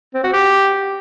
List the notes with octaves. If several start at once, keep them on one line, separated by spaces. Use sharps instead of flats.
C4
F#4
G4